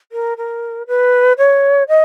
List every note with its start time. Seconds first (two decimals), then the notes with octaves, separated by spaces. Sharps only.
0.12 A#4
0.38 A#4
0.87 B4
1.38 C#5
1.88 D#5